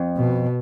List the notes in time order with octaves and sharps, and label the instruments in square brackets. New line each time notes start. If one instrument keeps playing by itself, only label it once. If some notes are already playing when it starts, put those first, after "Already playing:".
Already playing: [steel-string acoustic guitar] F2
[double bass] B2